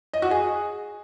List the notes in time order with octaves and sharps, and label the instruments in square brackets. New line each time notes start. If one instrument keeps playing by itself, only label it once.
[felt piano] D#5
F#4
G#4